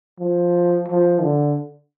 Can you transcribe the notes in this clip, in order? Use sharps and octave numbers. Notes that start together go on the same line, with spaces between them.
F3
F3
D3